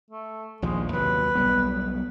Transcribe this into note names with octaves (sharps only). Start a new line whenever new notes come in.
A3
A#1 D#2 F3 G#3
D#2 C3 F#3 B4
B1 G3 B3